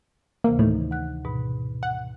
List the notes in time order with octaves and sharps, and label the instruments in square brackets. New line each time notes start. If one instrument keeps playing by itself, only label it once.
[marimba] D2 C3 E3 [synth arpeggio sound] A#3
[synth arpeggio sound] A2 [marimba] D#3 D#4
[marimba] F#5 F#6
G#2 B2 B5
[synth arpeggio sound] F#5